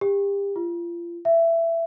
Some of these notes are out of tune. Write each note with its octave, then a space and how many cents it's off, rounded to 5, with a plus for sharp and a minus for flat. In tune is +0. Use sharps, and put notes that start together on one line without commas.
G4 +30
F4 -30
E5 +15